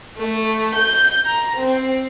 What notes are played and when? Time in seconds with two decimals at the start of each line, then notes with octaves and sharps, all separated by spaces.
0.18 A3
0.75 G6
1.25 A#5
1.56 C4